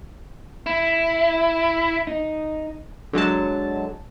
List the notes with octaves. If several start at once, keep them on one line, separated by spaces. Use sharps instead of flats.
E4
D#4
D3 F#3 G#3 A5